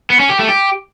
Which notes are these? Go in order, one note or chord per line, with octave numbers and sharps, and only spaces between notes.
B3
C#4
G4
A3
G4